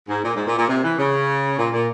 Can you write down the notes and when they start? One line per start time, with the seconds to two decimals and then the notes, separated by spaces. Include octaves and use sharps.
0.08 G#2
0.23 A#2
0.34 G#2
0.46 A#2
0.57 A#2
0.67 C3
0.83 E3
0.97 C#3
1.58 A#2
1.72 A#2